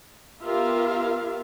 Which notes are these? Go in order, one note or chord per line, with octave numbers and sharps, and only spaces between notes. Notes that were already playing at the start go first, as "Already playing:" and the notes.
B3 F4 G4 A#4 E5 F5